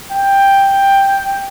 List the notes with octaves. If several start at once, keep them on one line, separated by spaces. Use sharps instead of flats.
G5